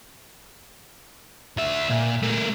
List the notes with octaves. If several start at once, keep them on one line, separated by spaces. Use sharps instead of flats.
D2 E5
A#2
A3 A#4